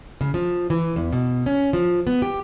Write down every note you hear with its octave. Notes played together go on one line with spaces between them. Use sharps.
C#3
F3
E3
E2
B2
C#4
F3
B3
G4